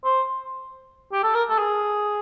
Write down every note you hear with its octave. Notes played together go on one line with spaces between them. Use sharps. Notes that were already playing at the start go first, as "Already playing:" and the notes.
C5
G4
A4
A#4
A4
G#4